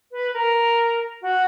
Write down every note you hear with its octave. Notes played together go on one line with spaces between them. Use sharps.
B4
A#4
F#4